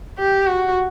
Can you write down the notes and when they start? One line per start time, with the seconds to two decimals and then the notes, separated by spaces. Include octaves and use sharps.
0.18 G4
0.47 F#4